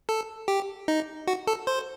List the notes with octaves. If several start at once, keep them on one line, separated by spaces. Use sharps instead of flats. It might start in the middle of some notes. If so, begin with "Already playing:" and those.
A4
G4
D#4
F#4
A4
C5